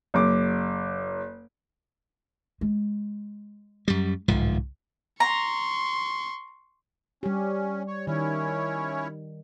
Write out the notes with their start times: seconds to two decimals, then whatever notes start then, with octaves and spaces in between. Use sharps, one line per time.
0.14 F#1 D6
2.61 G#3
3.88 F#2 G3
4.28 D1 C2 G#2 F3
5.20 A#5 C6 C#6
7.23 G3 C#4 G4
7.88 C#5
8.07 D#3 C#4 E4 C#5